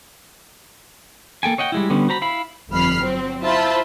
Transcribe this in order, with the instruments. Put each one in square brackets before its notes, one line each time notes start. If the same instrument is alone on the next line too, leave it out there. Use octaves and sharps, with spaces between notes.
[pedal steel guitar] A#3 A4 G5 G#5
C#5 D#5 F#5 G5
G3 G#3 E4
D3 G3 B3 C#4
F#4 C5 A#5 B5
E4 F5 B5
[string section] G1 F2 B5 F6 C7
F#3 C4
E4 F4 C5 E5 A5 B5